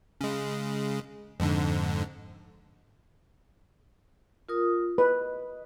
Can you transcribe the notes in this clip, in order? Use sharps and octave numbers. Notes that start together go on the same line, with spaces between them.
C#3 G#3
F2 G#2 D3
F4 A#4 D#6
B4 D#5